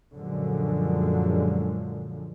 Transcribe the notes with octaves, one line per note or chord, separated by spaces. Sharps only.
F#2 A#2 D3 F3 F#3 G#3